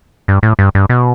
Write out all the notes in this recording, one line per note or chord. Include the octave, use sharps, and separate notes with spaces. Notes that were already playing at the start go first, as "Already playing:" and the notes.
G2
A2
G2
G2
B2